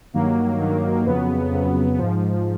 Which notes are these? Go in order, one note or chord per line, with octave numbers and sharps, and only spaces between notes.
G2 D#3 F#3 A#3
G2 D#3 F#3
F2 C#3 F#3 B3
F2 C#3 F#3
G#2 F3